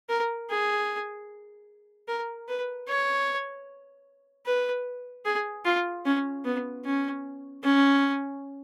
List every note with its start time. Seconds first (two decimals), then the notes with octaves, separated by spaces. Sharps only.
0.09 A#4
0.50 G#4
2.08 A#4
2.48 B4
2.88 C#5
4.46 B4
5.25 G#4
5.65 F4
6.05 C#4
6.45 B3
6.85 C#4
7.64 C#4